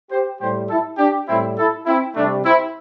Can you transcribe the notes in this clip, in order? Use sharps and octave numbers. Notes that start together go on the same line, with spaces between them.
G4 C5
A2 G3 G4 C5
E4 A4
D4 G4
A2 G3 C4 E4
E4 A4
C4 E4
C3 G3 A3 D4
C4 E4